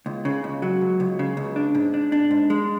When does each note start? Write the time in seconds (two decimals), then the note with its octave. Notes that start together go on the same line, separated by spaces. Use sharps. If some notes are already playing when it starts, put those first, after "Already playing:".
0.06 C#2
0.25 C#3
0.44 C#2
0.62 F#3
0.81 C#2
1.00 C#2
1.19 C#3
1.37 C#2
1.56 D4
1.75 G#2
1.94 D4
2.12 D4
2.31 G#2
2.50 G#3